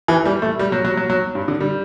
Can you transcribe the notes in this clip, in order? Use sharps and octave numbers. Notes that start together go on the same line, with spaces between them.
E3
G3
A3
G3
F#3
F#3
F#3
F#3
G2
D3
G3